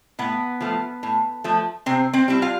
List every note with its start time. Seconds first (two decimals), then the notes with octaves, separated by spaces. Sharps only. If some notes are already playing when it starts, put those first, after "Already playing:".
0.19 A2 B3 B4
0.61 F3 A3
1.03 A2
1.44 F3 A3
1.86 C3 C4 C5
2.13 C4 C5
2.28 G3 C4 E4
2.42 F4 F5